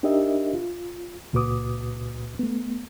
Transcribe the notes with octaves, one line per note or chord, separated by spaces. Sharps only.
D4 D#4 G4 A#4 D#5 E5
F4
C#2 A#2 F#4 B4 D6 D#6
A3 B3